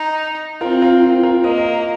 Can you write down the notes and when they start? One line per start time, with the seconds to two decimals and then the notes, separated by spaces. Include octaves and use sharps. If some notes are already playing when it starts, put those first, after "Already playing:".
Already playing: D#4
0.61 C4 F4 A#4
0.82 F4 A#4
1.02 F4
1.23 F4 A#4
1.43 A#3 A#4 D#5
1.58 A#4 D#5